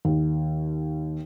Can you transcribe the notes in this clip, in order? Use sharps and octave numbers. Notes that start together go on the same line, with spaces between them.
D#2